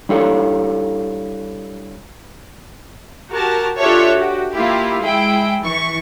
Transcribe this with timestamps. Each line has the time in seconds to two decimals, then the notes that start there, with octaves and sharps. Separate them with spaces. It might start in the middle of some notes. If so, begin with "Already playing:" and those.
0.09 G3 D4 E4 A4 C#5 F5
3.30 F#4 G4 A#4 A5
3.78 D4 F4 G4 A4 C#5 E5
4.13 F#4 G4
4.55 A#3 E4 F4 G4
5.01 G#3 E4 G#4 G5
5.61 E3 C#6